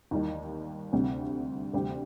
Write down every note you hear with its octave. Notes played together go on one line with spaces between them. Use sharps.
D#2 D#3 G3
D2 C3 G3 C4
D2 C3 G3 C4 G4